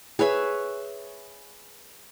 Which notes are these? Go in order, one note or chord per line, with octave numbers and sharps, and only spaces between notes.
G#4 B4 C#5 E5